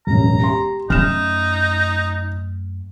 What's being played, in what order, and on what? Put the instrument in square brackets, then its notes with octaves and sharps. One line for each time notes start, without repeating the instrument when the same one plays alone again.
[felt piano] E1 A1 F#2 [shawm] A#5
[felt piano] G4 C6
[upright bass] F#2 A3 [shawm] D#4 [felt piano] F6 E7